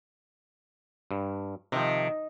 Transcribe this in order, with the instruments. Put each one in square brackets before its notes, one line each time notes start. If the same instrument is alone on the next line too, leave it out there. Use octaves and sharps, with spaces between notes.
[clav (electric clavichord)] G2
[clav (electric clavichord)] C3 F3 [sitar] D#3